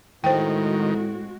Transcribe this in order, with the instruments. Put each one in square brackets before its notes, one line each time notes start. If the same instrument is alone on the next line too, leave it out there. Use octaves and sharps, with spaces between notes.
[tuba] A2 [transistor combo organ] D#3 [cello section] G#3 C4 F#4 [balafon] C5 G5